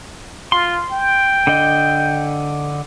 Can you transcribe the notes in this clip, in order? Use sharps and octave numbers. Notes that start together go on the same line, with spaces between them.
F4 C6
G5
D3 D#5